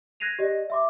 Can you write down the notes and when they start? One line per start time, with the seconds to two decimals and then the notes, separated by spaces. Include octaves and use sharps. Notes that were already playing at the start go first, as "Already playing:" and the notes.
0.20 F#6 G#6 A#6 C7 D#7 F7
0.39 G4 D5 D#5
0.70 E5 C6 D6